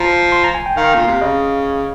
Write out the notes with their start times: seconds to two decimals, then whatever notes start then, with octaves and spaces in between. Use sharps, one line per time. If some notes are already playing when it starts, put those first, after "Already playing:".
Already playing: F3 A#5
0.32 C6
0.44 A#5
0.54 G#5
0.66 G5
0.77 D#3 F5
0.94 A#2
1.08 C3
1.21 C#3 D#5